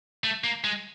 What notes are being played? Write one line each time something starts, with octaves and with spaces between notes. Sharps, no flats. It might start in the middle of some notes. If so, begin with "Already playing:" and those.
A3
A#3
G#3